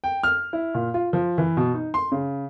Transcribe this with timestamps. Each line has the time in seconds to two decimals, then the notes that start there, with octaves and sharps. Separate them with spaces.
0.04 G5
0.23 F6
0.53 E4
0.74 A#2
0.94 F4
1.13 F3
1.38 E3
1.57 B2
1.74 D#4
1.94 C6
2.12 C#3